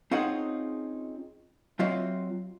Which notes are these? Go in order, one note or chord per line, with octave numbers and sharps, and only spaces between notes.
C4 C#4 D#4 F4 G#4 F#5
F#3 C4 F4 D#5 E5